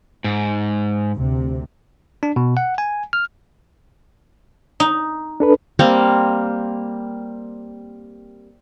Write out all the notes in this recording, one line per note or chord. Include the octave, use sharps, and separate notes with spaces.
G#2
D2 C3
D4
B2
F#5
G#5
F6
D#4
D4 A4 B4
G3 A#3 C4